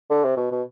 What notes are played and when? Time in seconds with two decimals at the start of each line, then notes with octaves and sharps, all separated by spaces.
0.10 D3
0.24 C3
0.37 B2
0.51 B2